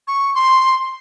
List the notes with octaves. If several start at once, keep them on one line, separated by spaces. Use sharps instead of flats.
C#6
C6